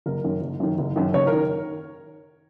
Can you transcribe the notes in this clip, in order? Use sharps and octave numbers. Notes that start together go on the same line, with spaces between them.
F#1 A#4
F#2 D#3
F#1
F#2 D#3
F#1
F#2 D#3
F#1 C#5
A#4
D#3